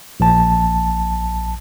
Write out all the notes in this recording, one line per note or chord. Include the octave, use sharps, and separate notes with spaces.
A#1 A5